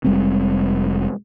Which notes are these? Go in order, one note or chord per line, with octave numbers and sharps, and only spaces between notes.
F1 G3 G#3 C4